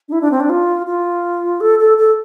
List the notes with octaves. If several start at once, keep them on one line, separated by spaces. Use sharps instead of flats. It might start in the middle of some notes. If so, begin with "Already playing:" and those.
D4
E4
D4
C4
D4
F4
F4
A4
A4
A4